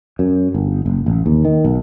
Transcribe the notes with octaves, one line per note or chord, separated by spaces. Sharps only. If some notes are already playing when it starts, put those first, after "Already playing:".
F#2
G1
F#1
A1
D#2
D#3
B1